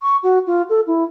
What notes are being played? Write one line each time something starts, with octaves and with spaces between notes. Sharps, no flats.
C#6
F#4
F4
A4
E4